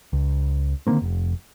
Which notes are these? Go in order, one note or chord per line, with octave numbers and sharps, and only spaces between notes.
C#2
D3 D#3 A#3 C4
F1